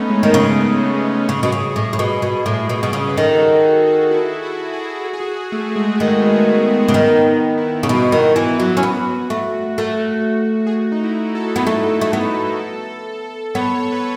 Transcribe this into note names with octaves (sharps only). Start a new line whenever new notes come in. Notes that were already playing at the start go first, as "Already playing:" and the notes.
Already playing: A3 B3 C#4 D#4
G#3
D#3
C#3 A3
B3
A3
B3
A3
B3
C#3 G#4
B2
C#3
A2
A2
B2
B2
A2
B2
B2
C#3
B4
D#3 A4
F#4
G#4
F#4
F#4
E4
F#4
G#4
F#4
G#4
F#4
A3
G#3
D#3 A3
B3
A3
A3
C#3
D#3 B3
E4
C#3
B2 F#4
D#3 E4
E3 E4
F#3 F#4
C#4
B3
A3
A3
G#4
F#4
D#4
E4
A4
B3
A3
A3
B3
B3 C#5
C#5
B4